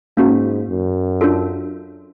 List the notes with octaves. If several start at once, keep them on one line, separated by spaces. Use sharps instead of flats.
G#2 A#3 C#4 F#4
F#2
D4 F4 A4